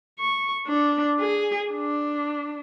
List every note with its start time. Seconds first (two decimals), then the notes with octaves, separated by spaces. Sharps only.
0.20 C#6
0.67 D4
1.20 G#4
1.71 D4